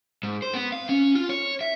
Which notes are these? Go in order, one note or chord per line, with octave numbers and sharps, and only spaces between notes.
G#2
C5
B3
F5
C#4
F4
C#5
E5